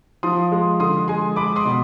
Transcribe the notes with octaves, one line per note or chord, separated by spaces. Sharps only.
F3 C6 D#6
G#3
D3 C6 D#6
G#3 G#5 C6
G#3 B5 D6
C6 D#6
B2